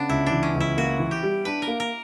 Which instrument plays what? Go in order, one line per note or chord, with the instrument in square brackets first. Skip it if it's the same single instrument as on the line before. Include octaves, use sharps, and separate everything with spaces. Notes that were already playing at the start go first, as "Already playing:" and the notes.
Already playing: [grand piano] C#3 [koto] B3 D4
[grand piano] C#2 [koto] E4
[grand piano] E3 [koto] D4
[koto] C#4
[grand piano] C#2
[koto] E4
[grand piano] A#3 [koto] F#4
[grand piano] E3
[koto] G4
[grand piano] G3
[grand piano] D4 [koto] B4
[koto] A#4
[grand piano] A#3
[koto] A#4